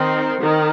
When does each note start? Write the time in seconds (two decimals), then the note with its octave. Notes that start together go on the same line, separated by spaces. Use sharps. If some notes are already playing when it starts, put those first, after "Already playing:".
Already playing: D#3 C4
0.40 D#3